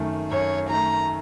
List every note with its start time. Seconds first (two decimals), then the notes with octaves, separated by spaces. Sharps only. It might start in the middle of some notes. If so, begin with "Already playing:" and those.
Already playing: F#2 D#3 A3
0.31 F#2 C#5
0.70 D#3 A3 A#5